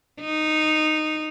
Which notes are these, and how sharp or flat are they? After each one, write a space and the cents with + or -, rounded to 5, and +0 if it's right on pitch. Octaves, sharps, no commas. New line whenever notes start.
D#4 -10